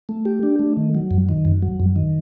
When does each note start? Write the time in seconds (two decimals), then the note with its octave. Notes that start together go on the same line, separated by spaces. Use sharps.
0.09 A3
0.25 G4
0.43 D4
0.59 A3
0.77 D#3
0.95 F#3
1.11 F#2
1.29 D#3
1.45 F#2
1.62 F#3
1.80 F#2
1.96 D#3